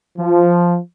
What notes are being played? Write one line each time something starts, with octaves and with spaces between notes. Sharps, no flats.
F3